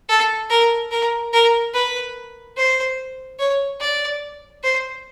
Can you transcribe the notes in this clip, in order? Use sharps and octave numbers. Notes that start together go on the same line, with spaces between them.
A4
A#4
A#4
A#4
B4
C5
C#5
D5
C5